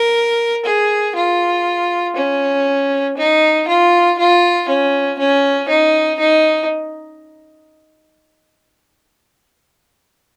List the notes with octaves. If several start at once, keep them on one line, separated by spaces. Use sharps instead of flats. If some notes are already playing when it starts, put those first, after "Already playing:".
Already playing: A#4
G#4
F4
C#4
D#4
F4
F4
C#4
C#4
D#4
D#4